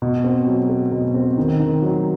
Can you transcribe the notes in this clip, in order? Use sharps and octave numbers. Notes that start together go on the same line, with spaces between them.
B2
C4
F#3
A3
B2
C4
D#3
D#3
F#3